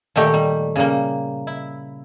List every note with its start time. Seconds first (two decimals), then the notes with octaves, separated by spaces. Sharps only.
0.16 A#2 D#3 A3 G4
0.34 G3
0.76 C#3 G3 A#3
1.47 E4